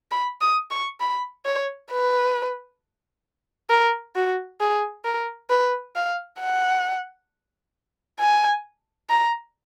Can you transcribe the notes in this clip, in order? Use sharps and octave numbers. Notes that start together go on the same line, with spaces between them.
B5
D#6
C#6
B5
C#5
B4
A#4
F#4
G#4
A#4
B4
F5
F#5
G#5
A#5